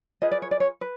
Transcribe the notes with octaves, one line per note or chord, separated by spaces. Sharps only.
F4 G#4 B4 D#5
D5
C#5
D5
C#5
B4